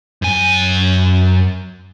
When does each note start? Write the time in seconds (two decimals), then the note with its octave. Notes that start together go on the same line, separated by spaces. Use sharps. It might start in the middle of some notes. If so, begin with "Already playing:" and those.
0.22 F#2 G#5